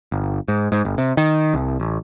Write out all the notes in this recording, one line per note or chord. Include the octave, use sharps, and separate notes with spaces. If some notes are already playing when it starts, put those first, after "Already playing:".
G1
G#2
G#2
G1
C3
D#3
C2
A1